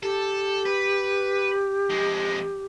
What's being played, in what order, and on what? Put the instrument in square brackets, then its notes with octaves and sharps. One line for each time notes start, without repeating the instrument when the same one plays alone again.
[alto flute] G4 [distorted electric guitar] A4
[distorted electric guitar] B4
F2 G#3